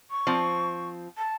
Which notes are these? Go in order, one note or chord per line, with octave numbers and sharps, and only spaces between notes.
C#6
F3 C4
A5